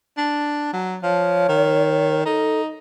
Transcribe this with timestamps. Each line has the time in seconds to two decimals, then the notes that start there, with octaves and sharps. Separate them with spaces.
0.18 D4
0.73 F#3
1.03 F3 C#5
1.49 D#3
2.25 D#4 A4